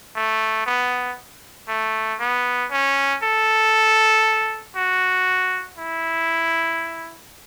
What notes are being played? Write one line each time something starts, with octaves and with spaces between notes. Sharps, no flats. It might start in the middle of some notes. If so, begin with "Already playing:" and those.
A3
B3
A3
B3
C#4
A4
F#4
E4